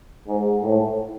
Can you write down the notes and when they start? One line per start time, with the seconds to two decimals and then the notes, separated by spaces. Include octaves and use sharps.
0.28 G#2
0.63 A2